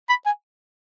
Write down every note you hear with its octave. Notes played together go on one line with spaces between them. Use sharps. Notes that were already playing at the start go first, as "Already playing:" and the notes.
B5
G#5